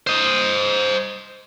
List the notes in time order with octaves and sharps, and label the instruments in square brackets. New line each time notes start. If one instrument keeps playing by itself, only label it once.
[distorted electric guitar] C5 D#5